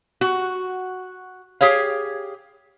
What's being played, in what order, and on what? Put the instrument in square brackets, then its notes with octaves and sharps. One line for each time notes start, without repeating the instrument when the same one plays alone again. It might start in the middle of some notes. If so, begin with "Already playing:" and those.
[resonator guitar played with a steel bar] F#4
G4 G#4 C#5 F5